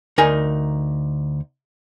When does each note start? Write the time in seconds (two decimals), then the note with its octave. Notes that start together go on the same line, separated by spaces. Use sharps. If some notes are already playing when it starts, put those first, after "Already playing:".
0.18 D2 D#4 A#4 G#5